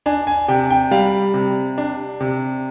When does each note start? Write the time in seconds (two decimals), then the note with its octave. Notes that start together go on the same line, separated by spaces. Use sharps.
0.06 D4 G#5
0.27 G#5
0.48 C3 G5
0.71 G5
0.91 G3 F5
1.34 C3
1.78 D4
2.20 C3